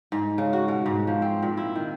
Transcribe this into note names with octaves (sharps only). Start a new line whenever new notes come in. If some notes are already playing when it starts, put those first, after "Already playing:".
G#2
C#3
F#4
B2
G#2
F3
C4
A#2
E4
D#3